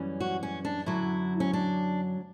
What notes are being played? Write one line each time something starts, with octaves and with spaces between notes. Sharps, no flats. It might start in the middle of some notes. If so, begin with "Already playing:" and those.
Already playing: F#2 E3 G3 C#4
F#4
C#4
D4
F#2 D3 F#3 E4
C#4
D4